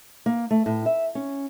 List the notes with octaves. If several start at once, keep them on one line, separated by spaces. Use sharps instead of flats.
A#3
A3
A2
E5
C#4